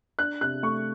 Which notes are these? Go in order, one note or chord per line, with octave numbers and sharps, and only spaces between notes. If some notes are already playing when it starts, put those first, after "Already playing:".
D4 F#6
C3 F#6
A3 C#6